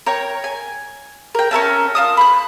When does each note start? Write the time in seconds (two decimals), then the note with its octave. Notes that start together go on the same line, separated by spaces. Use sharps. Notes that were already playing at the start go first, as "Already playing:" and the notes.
0.06 A#4 C#5 G5
0.44 G#5
1.35 A#4 G5
1.51 C#4 A#4 E5 A5
1.95 F4 A5 D#6
2.17 B5 C6 F#6